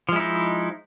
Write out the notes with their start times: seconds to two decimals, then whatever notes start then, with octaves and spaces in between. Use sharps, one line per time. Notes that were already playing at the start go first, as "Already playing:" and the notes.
0.09 F3
0.12 G#3
0.16 E4
0.20 D#4